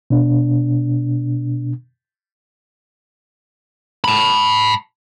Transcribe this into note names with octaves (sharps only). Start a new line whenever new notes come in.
B2 D4
A5 B5